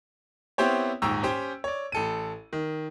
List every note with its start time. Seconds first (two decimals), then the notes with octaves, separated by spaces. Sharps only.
0.58 B3 C4 E4 G4 C5 C#5
1.02 D#1 G#2 G5 A#5 C#6 E6
1.23 C#4 G4 C5 G5
1.64 C#5 D5
1.92 A1 A4 D#7
2.53 D#3